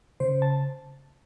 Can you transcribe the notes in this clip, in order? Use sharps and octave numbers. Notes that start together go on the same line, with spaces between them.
C#3 C5
A5